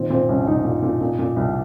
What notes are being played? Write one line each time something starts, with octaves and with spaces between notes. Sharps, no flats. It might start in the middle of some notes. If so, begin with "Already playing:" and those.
Already playing: A#2 D#3 C4
A#2 C4
C2 C#4
C#4
C2 D#4
A#2
A#2
A#2
A#2
C2